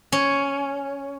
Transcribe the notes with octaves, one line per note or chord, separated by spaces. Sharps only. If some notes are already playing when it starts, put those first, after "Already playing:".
C#4